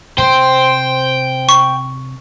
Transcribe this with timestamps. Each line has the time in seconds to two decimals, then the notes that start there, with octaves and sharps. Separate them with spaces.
0.18 C3 C5 G5
1.49 C#6